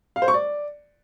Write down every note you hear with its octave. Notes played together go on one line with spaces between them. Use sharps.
F5
C5
C#6
D5